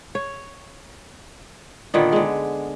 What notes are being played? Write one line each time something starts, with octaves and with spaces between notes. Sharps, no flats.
C#5
A#2 D3 D#3 B3
D3 G#3